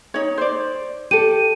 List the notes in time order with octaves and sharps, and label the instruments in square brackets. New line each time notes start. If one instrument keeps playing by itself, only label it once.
[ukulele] D#4 C#5
C5 D5
[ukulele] G4 A4 [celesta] D#7